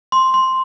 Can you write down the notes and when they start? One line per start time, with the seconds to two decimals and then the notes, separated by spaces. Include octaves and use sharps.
0.12 C6
0.34 C6